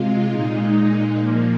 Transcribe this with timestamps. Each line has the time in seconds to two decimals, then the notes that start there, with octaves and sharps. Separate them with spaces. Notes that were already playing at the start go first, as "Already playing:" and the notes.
Already playing: C3 G#3 F4
0.31 A#2 G#3 D#4
1.15 A#2 F3 A#3